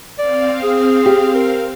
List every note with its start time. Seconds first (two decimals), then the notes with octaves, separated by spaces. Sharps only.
0.19 C4 D5 F5
0.64 G#4
1.06 G4
1.35 A#4